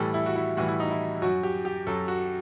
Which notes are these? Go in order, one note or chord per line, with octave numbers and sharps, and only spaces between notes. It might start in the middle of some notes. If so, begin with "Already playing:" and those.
Already playing: A2 E3 G3 A4
E4
F#4
E4
A2 E3 G3 F#4
E4
D#4
E4
F#2 F#3 F#4
G4
G4
F#2 F#3 A4
F#4